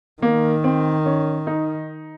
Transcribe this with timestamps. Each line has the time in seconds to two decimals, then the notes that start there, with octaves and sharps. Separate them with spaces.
0.22 D#3 A#3
0.64 C4
1.06 C#4
1.47 D#4